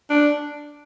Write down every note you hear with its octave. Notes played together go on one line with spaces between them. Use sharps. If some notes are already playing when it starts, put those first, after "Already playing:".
D4